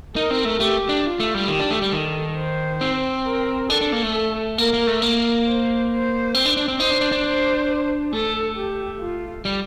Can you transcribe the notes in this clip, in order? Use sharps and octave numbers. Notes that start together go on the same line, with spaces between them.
D#4 A#4
C4
A3
A3 G4
D4
F4
A3
G3
D#3 G4
D4
A3
G3
D#3 A4
C5
C4
A#4
D4 A4
D4
A#3
A3
A#3 A#4
A#3
A3
A#3 A#4
C5
C5
C4
D4
D4
C4
D#4 C5
D4
D4
D4
C5
A3 A4
G4
F4
G3